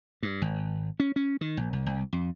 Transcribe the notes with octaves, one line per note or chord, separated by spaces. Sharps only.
G2
G#1
C#4
C#4
D#3
A#1
C2
C2
F2